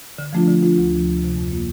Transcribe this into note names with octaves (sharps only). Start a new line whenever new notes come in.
D3
F3 A3 D4 F4
D3
F3 A3 D4 F4
D2
C3 F3
D2
C3 F3
F2
D3 G3 A#3 F4